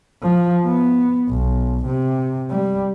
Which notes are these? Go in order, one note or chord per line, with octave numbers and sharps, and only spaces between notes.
F3
B3
B1
C3
G3